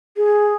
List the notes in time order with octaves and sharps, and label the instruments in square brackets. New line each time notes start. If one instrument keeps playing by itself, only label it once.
[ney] G#4